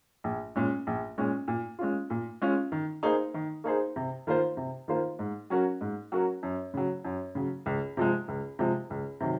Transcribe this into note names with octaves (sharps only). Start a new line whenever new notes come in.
A#1
A#2 G#3 C#4
A#1
A#2 G#3 C#4
A#2
G#3 C#4 F4
A#2
G#3 C#4 F4
D#3
A#3 D#4 G#4 C5
D#3
A#3 D#4 G#4 C5
C3
D#3 A#3 F4 C5
C3
D#3 A#3 F4 C5
G#2
F#3 C#4 F#4 A#4
G#2
F#3 C#4 F#4 A#4
F#2
C#3 F#3
F#2
C#3 F#3
C#2
C3 F3 G#3
C#2
C3 F3 G#3
C#2
C3 D#3 F#3